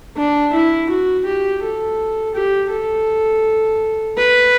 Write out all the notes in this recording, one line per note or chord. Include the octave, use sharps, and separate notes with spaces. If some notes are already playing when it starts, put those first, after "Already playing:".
D4
E4
F#4
G4
A4
G4
A4
B4